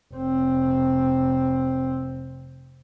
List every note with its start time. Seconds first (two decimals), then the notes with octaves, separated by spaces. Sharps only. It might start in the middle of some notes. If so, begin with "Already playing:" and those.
0.14 F1 C4